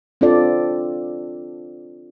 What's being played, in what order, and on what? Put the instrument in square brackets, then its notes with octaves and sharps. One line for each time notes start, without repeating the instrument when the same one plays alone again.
[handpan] C4 D4 F4 A4 D5